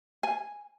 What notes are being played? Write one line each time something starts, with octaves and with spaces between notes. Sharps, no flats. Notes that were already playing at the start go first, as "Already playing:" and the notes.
G#5